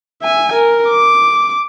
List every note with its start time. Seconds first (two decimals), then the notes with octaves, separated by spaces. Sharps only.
0.23 E5 G#5
0.53 A#4
0.88 D6